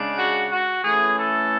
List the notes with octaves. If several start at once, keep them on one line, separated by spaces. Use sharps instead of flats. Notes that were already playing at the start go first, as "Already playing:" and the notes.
Already playing: C#3 G#3 D4
F#4
F#4
E3 A3 C#4 G#4
A4